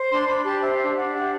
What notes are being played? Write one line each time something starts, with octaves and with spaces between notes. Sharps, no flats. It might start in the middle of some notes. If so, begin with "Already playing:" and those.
Already playing: C5
D4 C6
D4 B5
G4 A5
C5 E5
D4 E5
D4 F#5
G4 F#5